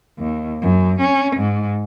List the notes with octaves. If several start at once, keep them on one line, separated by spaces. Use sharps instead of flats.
D#2
F#2
C#4
G#2